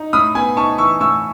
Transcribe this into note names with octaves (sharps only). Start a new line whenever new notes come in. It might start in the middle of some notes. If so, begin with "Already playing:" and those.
Already playing: D#4
A2 B5 D#6
B3 G#5 B5
D#4 A5 C#6
E3 C#6 E6
A2 C#6 E6